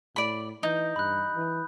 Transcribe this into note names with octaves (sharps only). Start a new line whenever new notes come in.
A2 D5 B5
E3 D#4 D#6 G6
G2 B5 F#6
E3